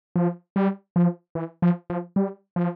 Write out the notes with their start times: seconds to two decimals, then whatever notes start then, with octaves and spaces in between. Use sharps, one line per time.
0.16 F3
0.56 G3
0.96 F3
1.35 E3
1.62 F3
1.90 F3
2.16 G3
2.56 F3